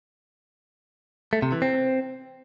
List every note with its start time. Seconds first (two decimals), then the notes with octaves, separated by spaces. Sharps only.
1.33 A3
1.42 C3
1.52 E3
1.62 C4